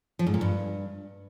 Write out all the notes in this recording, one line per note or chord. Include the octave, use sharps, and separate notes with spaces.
F3
G#2
A#2
G2